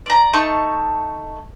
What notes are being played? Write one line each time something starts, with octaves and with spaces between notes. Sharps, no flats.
D5 A#5
A3 D#4 A5 C#6